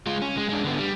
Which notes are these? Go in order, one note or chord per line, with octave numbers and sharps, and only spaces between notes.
G#3 F4
C#4
G#3
G#3 D4
D3 B3
G3